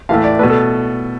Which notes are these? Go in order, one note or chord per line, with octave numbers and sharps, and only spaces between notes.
A2 E3 A3 F5
D5
B2 A3 B4
A4